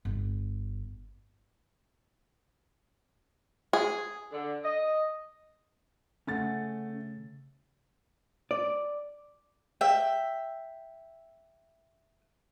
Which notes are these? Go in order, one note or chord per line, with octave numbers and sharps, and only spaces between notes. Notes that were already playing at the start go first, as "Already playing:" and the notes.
G1
G#4
D3
D#5
C#3 A3 C#4 F#5 A6
D5
E5 G5